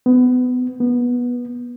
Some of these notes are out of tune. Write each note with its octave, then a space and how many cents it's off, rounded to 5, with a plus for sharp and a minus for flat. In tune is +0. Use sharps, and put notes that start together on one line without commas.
B3 +25
B3 -15